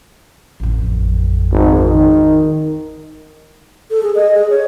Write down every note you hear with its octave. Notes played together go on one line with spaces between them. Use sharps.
A1 F2
G#1
D#3
A4
G#4
D#5
G#4
C#5